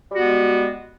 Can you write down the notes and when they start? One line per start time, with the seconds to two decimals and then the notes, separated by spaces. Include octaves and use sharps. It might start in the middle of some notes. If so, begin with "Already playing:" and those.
0.12 G3
0.15 F#4
0.19 B3
0.22 G#3